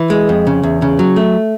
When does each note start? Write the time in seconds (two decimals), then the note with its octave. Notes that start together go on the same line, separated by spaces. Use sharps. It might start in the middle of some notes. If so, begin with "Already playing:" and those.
Already playing: E3
0.10 G#3
0.29 F2
0.47 C#3
0.63 E2
0.82 C#3
0.99 F#3
1.16 A3